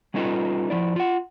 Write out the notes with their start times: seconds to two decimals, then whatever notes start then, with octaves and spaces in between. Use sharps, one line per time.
0.14 G3 C#4 D#4 F4 A4 B4
0.70 F3 E4 D5
0.96 F4 F#5